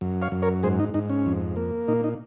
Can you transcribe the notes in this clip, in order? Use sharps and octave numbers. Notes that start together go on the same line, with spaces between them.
F#2
C#5 F5
F#2
A#4 C#5
G#2 G#4 C5
D#4
G#2 D#4
C#4
F2
A#3
A#2 D#4
D#4